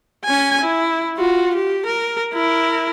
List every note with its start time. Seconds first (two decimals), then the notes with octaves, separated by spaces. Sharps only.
0.24 C#4 G#5
0.61 E4
1.17 F4 F#4
1.55 G4
1.86 A#4
2.33 E4 A#4